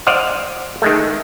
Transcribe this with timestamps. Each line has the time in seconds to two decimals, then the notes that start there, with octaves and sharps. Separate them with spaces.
0.07 C5 D5 D#5 F5 F#5
0.82 D#3 G#3 A3